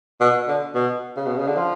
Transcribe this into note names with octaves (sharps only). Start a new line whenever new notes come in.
B2
D3
B2
C#3
B2
C#3
D3
F3